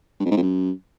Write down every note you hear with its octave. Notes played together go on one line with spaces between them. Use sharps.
G2
F2
G#2
F2
F#2